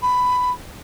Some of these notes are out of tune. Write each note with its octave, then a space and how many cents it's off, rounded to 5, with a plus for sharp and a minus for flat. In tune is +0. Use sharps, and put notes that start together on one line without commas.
B5 +10